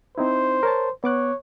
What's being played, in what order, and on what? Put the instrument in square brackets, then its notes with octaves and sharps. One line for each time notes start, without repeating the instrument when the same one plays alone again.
[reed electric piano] C4 D#4 E4 [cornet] C5
[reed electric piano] A#4 C#5 A5
[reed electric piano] B3 D6 F#6 [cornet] C#5